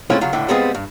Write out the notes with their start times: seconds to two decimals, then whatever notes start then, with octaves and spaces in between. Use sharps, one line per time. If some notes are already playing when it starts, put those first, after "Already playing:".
0.10 G#3 A3 C4 C#4 E4 F4
0.21 C#3 F#3 F4
0.33 C#2 A2 D3 E5
0.48 G3 G#3 B3 C4 F4 G#4
0.75 G2